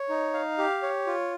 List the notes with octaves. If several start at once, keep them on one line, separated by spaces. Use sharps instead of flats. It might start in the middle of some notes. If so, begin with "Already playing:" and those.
Already playing: C#5
D#4
F5
G4
C#5
F4